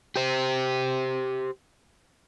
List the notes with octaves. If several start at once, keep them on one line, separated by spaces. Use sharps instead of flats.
G4 C5